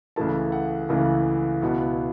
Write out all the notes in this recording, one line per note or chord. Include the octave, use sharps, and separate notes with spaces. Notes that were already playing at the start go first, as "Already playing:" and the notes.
C#2 C#3 E3 A3 E4 A5
F#5
C#2 C#3 E3 A3 E4
C#2 B2 B3 E4